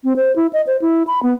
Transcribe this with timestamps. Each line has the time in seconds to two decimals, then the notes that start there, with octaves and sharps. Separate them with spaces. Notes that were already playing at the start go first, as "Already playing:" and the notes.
0.04 C4
0.16 C5
0.36 E4
0.53 D#5
0.67 C5
0.82 E4
1.07 B5
1.23 B3